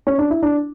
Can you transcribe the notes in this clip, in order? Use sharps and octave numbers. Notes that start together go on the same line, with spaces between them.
C#4
D4
E4
D4